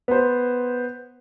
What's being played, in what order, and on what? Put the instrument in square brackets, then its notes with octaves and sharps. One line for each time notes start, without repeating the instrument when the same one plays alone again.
[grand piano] B3 C5